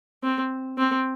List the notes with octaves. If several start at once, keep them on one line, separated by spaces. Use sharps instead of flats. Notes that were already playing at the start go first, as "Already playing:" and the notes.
C4
C4